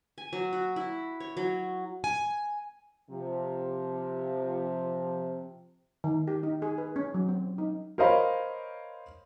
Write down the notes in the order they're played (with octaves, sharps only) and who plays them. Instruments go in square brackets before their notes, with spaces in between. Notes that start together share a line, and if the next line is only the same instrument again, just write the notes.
[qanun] G#5
F#3
F#4
E4
C#5
F#3
[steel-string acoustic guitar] G#5
[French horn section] C3 F3
[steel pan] D#3
G4
D#4
G#4
B4
C#4
F#3
C4
D#4
[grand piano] A#4 C5 C#5 D#5 F5 B5